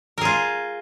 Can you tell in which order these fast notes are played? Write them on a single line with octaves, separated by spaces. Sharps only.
A#4 G#4 F4